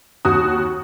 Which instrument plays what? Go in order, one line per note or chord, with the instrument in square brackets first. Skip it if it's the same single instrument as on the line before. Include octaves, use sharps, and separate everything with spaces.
[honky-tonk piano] D#2 F#4 D#6